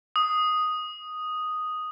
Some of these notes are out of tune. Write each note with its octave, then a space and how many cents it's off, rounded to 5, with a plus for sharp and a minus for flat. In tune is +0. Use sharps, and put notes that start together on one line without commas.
D#6 +0